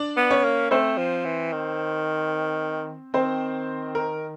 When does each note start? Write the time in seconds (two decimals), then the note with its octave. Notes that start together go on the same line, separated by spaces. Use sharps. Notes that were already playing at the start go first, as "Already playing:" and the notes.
Already playing: D4 D5
0.17 B3
0.31 C#4 C#5
0.44 A#3
0.71 A3 C4 C5
0.98 F3
1.25 E3
1.52 D#3
3.14 D#3 C4 C5
3.95 A#4